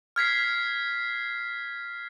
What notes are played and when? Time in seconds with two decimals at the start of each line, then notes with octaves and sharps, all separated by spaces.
0.16 F6 G#6 B6 C7